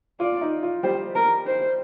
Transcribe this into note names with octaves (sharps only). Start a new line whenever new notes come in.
F4 D5
D#4
F4
G3 G4 C5
A#4
C5